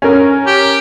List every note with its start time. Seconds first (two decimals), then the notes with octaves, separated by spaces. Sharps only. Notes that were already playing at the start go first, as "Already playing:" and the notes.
0.02 C#4 A#4
0.47 G4